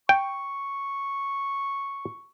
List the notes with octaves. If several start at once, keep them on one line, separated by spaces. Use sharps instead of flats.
G5 C#6